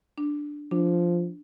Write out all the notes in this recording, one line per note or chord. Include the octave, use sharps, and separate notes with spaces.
D4
F3 D4